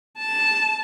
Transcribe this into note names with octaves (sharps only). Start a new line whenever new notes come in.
A5